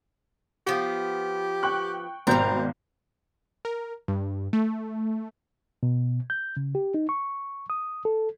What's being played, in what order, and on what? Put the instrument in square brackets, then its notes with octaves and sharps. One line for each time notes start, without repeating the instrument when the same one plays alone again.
[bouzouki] F3 B3 [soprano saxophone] G4
[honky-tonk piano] G5 C#6 F#6
[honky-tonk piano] G#1 B2 G6 [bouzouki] G3 A#5 [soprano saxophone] C4
[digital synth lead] A#4
G2
A3
[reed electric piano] B2
G6
C#3
G4
D#4
C#6
D#6
A4